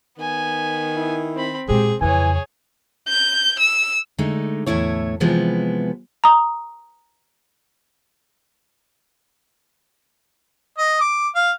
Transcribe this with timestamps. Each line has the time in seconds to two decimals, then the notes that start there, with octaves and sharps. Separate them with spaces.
0.18 D#3 B3 G#5
0.96 E4
1.35 C4 B5
1.68 A#2 G#3 C4 G4 G#4
2.01 F2 C#3 E3 G#4 C#5 G#5
3.08 G6
3.60 E6
4.18 D3 G#3 A3 D#4
4.66 E2 A2 A3 E4 C#5
5.20 C3 E3 F3 G#3 B3
6.24 A#5 D#6
10.78 D#5
11.00 D6
11.35 F5